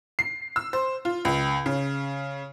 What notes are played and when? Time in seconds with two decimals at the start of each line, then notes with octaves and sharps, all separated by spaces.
0.19 C7
0.56 E6
0.73 C5
1.05 F4
1.25 C#2
1.66 C#3